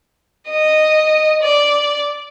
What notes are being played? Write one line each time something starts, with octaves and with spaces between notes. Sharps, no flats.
D#5
D5